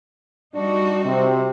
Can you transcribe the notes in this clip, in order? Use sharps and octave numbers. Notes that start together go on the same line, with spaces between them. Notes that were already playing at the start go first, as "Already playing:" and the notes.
G3 D4 D#4 F#4
C3 C4